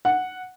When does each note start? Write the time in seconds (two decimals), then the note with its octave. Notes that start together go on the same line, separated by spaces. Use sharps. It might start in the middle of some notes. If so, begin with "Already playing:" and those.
0.05 F#5